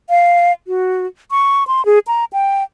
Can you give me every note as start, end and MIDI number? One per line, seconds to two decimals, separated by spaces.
0.09 0.52 77
0.67 1.06 66
1.31 1.67 85
1.67 1.85 84
1.86 1.99 68
2.07 2.25 82
2.33 2.63 79